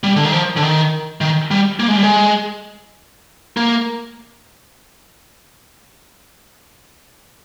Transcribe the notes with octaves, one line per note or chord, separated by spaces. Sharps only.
G3
D3
D#3
F3
D3
D#3
D#3
G3
A#3
G#3
G3
G#3
A#3